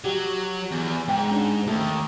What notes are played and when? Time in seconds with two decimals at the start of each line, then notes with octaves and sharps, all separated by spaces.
0.04 F#3 G4
0.72 E2
1.09 G#2 G5
1.29 C#4 D4
1.67 D#2 A3